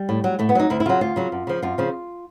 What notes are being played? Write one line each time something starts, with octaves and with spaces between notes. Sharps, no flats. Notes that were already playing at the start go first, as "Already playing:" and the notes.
Already playing: G3
A2
F#3
A2 A3
B3
F#3 D#4
D2 E4
E4
C#3 F#3 F4
D2 F4
C#3 F#3
F#2
C#3 F3
F#2 F4
C#3 F3